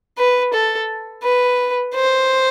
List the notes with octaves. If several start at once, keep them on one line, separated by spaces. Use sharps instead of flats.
B4
A4
B4
C5